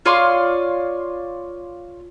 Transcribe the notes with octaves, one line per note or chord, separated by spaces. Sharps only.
F4 C#5 D5 C6